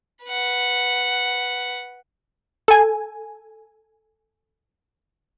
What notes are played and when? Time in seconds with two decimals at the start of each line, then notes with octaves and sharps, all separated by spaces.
0.25 B4 F#5
2.68 A4 G#5